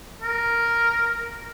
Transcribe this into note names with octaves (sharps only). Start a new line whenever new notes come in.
A#4